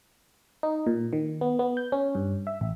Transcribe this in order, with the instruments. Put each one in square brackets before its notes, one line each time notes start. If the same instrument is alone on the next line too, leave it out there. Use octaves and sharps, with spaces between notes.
[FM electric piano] D#4
A#2
D#3
B3
B3
G6
C#4
G2
E5
A1